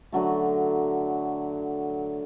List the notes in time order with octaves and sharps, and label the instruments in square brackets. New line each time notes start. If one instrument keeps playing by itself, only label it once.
[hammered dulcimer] D3 F#3 A3